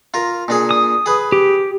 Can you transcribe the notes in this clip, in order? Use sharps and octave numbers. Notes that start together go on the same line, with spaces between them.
F4 A#4
A#2 D4 G#4
D#6
G#4 B4
G4